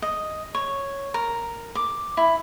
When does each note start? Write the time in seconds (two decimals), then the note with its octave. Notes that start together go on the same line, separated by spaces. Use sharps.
0.02 D#5
0.55 C#5
1.14 A#4
1.75 D6
2.17 E4